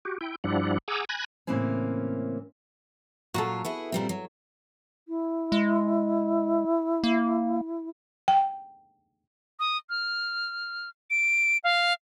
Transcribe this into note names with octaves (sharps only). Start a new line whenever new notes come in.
F#4 G4
E4 G5
G2 F3 G3 D4 E4 F#5
G#4 F#5 G#5 A#5 D6 E6
G#5 B5 F#6 G#6 A#6
A2 C#3 E3 A#3 C4 C#4
A#2 F#3 F4 F#4 A4
B3 E4 G#4
A#2 G3 C4
F#3
E4
G#3
A#3
G5
D#6
F6
D7
F5